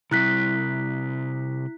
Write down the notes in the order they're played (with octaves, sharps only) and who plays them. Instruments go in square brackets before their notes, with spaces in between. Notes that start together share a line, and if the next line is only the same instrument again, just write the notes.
[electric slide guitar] C3 G3 C4 [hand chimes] E4 F#6 B6